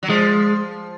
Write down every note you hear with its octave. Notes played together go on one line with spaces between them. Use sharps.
F#3
F3 G#3